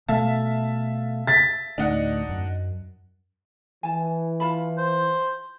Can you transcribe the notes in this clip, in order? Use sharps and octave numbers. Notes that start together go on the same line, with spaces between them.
B2 A3 E5 F5 A5
A6 B6
D2 A2 D4 D#4 F#5
F#2
E3 G#5 A5
F4 A5 B5
C5